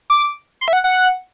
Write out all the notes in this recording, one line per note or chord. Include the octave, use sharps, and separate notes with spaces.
D6
C6
E5
F#5
F#5